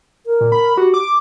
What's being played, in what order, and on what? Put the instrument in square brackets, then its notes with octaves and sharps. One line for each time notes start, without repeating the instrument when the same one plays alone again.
[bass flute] A#4
[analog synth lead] A#2
B5
[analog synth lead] F#4 [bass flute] G4
[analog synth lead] D6